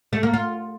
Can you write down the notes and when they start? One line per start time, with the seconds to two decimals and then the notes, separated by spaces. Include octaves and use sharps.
0.13 A3
0.23 A#3
0.33 F4